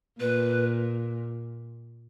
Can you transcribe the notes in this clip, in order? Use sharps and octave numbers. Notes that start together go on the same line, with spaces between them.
A#2 B4